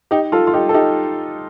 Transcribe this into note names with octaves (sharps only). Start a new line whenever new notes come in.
D#4 G4
F4 A4
F4
D#4 G4
A4
D#4 G4